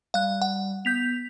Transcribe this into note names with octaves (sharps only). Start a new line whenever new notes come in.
G3 F5 F#6
F#5
B3 G6 B6 F7